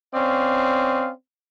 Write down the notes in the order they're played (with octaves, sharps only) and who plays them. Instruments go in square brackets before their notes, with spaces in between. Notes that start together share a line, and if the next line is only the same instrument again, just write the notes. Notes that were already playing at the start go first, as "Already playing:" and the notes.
[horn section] C4 C#4 D5 F5